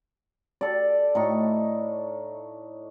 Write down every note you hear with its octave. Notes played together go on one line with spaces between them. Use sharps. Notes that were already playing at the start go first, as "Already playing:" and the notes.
A4 D5
A2 D#4 C#6